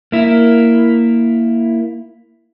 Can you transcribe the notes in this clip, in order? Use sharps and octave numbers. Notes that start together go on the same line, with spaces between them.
A#3 E4